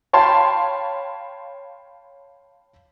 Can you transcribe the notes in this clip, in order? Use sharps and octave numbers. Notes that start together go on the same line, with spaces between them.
C#5 F5 G5 A5 B5 C6